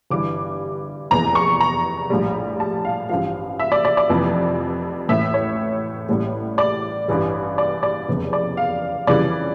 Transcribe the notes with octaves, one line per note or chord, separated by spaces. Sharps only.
G1 G2 E3 G3 D6
F1 E2 E3 A#5
C#6
A#5
A#1 A2 G3
A5
F5
A1 G2 F3 F5
E5
D5
D5
D5
F1 F2 E3
A1 A2 E3 E5
C#5
A1 A2 G3
D5
A1 G2 E3 G3
D5
D5
F1 E2 C#3
D5
F5
F2 C#3 E3 G3 D5